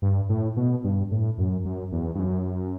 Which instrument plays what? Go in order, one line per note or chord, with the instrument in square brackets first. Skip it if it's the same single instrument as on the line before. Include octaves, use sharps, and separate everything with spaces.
[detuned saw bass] G2
A2
B2
G2
A2
F#2
F#2
E2
G2
F#2